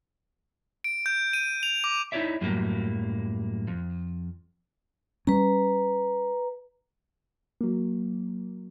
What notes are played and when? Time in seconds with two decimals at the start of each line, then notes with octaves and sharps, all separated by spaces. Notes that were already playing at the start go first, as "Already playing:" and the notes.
0.84 D7
1.06 G6
1.33 D#7
1.63 F7
1.84 D6
2.12 D#4 E4 G4 C#5 D5 E5
2.41 F#2 A2 F#3 G3 A#3
3.68 F2
5.27 G3 C#4 B4 A#5
7.61 F#3 A#3